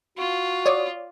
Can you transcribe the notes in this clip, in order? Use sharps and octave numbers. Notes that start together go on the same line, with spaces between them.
F4 F#4
C#5 D5 D#6